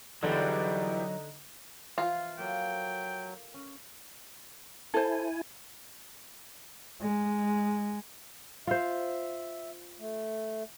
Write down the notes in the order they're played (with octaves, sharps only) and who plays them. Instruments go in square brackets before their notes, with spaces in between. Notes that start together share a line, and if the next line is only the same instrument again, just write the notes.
[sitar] E2 G3 [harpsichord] D3 [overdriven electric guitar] F#3 [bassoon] D#4
[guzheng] E3 F3 [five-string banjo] F4
[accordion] F#3 [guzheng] A#3 A4 [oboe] G5
[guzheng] C#4
[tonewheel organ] E4 G#5 [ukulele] A4 C5
[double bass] G#3
[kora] F4 C5 [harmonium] E5
[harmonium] A3